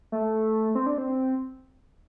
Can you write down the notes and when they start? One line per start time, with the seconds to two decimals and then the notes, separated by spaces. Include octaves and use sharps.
0.12 A3
0.75 C4
0.86 D4
0.98 C4